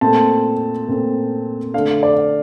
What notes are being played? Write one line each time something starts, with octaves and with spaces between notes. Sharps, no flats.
A#2 A3 C4 A5
A#2 A3 C4
D3 A3 D4 F5
D5